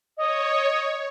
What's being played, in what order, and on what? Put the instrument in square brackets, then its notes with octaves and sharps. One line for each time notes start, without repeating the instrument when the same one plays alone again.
[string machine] C#5 [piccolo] D#5